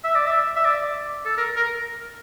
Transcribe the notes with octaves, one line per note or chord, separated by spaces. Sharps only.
E5
D5
E5
E5
D5
A4
A#4
A#4